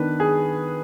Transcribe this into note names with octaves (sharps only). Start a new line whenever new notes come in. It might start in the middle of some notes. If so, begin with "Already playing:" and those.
Already playing: D#3 B3 D4 B4
G#4